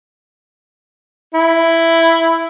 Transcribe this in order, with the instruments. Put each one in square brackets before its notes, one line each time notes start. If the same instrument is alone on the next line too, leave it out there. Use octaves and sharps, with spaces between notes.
[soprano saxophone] E4